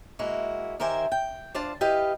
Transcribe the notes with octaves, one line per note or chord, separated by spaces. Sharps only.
G#3 A#3 E4 F#4
D#3 G4 A#4 C5 E5 G#5
G5
D4 F4 C5 D5 A5
E4 G4 B4 D#5 F5